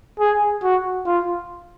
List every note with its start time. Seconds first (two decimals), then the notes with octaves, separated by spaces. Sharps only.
0.20 G#4
0.63 F#4
1.06 F4